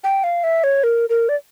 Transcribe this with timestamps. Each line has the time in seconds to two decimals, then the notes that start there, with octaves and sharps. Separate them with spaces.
0.04 G5
0.24 F5
0.44 E5
0.64 C#5
0.84 A#4
1.10 A#4
1.29 D5